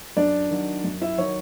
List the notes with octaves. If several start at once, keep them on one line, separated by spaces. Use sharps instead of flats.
F#2 D4 D5
D#3 F#3
F#2
E4 E5
D#3 F#3 C#5